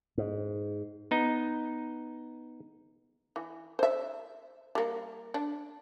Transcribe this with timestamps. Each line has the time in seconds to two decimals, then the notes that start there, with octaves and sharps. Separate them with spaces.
0.18 G#2
1.11 B3 D#4
3.36 E3
3.79 C5 E5
4.75 G3 A#3
5.34 D4